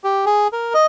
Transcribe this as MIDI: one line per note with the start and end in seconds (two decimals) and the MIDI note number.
0.04 0.25 67
0.26 0.48 68
0.53 0.73 70
0.74 0.86 75